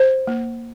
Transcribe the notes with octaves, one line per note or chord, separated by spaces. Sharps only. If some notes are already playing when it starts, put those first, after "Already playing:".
Already playing: C5
A#3